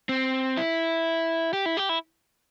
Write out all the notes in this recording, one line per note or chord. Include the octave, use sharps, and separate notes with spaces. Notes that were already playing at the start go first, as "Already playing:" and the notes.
C4
E4
G4
E4
G4
E4